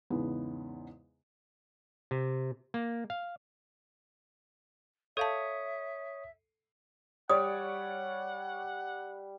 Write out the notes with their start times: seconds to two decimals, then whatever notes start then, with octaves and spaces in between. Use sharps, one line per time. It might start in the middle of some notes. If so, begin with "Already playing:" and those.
0.10 E2 G#2 C#3 G#3 B3
2.11 C3
2.74 A#3
3.10 F5
5.17 A4 C#5 E5 F5 A5 D#6
7.29 G3 C#5 D5 F#5 D#6